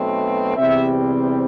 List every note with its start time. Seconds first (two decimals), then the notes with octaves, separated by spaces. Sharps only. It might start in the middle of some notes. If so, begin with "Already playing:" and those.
Already playing: B1 B2 A3 C4
0.57 E2 C3 G3 C4 E5